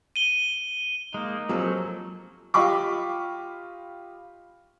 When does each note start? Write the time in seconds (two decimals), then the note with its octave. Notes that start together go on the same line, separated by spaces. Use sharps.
0.16 D#7 G7
1.14 G#3 A#3 D#4
1.49 F3 F#3 A#3 C4 C#4 G4 A4
2.54 F4 G4 D#5 B5 C#6 D6